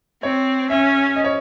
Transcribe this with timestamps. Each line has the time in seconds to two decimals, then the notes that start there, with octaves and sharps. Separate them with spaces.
0.23 C4 C#5
0.70 C#4 E5
1.16 D#5
1.24 C#5